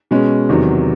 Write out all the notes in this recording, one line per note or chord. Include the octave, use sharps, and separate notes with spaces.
B2 G#3 C#4
E2 C3 D#3 F#3